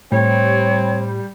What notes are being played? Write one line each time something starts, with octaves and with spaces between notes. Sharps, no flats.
A2 G3 C4 C#5